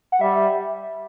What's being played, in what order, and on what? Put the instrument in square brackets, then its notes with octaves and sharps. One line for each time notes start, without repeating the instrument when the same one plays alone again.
[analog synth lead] F#5
[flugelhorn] G3 [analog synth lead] E5